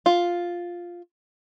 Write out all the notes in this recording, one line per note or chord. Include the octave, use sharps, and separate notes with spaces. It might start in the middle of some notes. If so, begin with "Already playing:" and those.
F4